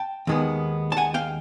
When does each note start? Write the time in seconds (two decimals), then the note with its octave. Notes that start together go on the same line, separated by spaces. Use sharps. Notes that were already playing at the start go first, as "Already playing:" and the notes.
Already playing: G5 A5
0.27 D#2 D#3 G#3 B3
0.92 A5
0.97 F#5 G#5
1.14 F5 G5